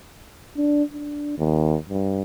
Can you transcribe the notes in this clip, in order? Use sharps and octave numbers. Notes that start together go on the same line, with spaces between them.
D4
D4
D#2
G2